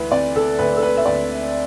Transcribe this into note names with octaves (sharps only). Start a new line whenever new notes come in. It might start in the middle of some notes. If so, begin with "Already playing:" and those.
Already playing: D2 E3 B4
C3 D5
A4
D2 B4
A4
B4
E5
D2 D5